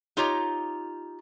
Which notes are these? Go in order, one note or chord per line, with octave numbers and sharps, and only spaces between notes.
D#4 F4 G4 C#5 A#5